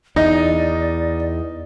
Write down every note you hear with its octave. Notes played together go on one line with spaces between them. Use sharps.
E2 D#4 D5 D#5